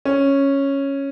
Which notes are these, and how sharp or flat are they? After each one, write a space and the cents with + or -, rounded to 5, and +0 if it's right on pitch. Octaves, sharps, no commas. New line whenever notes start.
C#4 -5